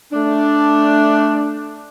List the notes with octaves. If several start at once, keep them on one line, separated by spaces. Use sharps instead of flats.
A3 D4